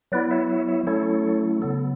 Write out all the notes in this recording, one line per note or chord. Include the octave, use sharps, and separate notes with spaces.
F#3 B3 E4 B4 D5
C#5 E5
C#5 E5
C#5 E5
F#3 A3 C#4 E4 A4 C#5
C#3 F#3 B3 A4